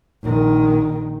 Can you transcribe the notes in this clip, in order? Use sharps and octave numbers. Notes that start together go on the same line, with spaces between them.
A#1 D#3